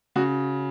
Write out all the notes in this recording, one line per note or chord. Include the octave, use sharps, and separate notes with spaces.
C#3 F#4